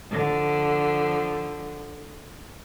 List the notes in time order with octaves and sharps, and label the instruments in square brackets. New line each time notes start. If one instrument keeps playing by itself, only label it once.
[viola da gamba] D3 F3